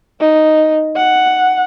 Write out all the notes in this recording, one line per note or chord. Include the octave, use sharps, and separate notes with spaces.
D#4
F#5